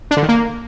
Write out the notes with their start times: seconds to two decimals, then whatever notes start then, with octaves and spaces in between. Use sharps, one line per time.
0.11 D4
0.17 D3
0.23 D#3
0.29 A#3